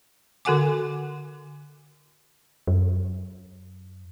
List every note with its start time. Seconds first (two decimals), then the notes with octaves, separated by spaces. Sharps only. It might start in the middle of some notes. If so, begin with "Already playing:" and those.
0.45 D3 F#4 A4 F#5 G#5 D6
2.67 F#2